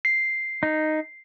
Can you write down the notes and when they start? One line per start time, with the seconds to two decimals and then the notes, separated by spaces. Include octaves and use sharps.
0.05 C7
0.63 D#4